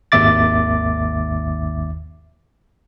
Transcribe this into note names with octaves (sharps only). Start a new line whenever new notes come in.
G#1 D#2 E5 D6 A6